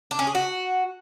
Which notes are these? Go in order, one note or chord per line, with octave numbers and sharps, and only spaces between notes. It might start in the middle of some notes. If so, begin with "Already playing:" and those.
D4
C#4
G#4
F#4